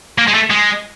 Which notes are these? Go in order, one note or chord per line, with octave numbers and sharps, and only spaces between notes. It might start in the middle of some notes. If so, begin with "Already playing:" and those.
A#3
G#3
A3
G#3